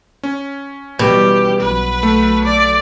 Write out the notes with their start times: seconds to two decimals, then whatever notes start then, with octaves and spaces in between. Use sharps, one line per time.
0.23 C#4
0.99 B2 E3 G3 G4
1.60 B1 F#3 B4
2.03 A3
2.45 D5